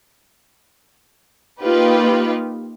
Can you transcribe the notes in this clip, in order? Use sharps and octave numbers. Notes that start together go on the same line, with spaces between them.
A#3 D#4 F4 G4 B4